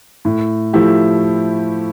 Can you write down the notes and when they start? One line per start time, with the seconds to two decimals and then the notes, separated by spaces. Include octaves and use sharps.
0.25 A2
0.73 F3 A3 E4 G4